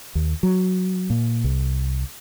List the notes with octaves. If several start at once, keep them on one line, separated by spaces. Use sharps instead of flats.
D#2
F#3
A#2
C2